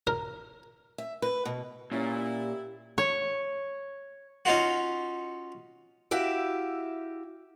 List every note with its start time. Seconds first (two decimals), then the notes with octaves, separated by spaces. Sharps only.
0.07 A#4
0.98 E5
1.22 B4
1.45 B2
1.92 A#2 C#4 E4 G4
2.98 C#5
4.45 C#4 D#4 F4 F#4
6.11 E4 F#4 G4 E5 F5